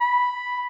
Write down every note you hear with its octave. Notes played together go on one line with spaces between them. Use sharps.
B5